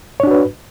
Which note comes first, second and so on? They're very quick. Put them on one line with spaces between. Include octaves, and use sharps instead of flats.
C#5 D4 F#4 B4